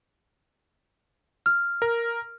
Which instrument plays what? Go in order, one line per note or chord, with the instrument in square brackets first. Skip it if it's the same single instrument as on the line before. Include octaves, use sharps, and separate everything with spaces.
[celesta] F6
[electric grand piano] A#4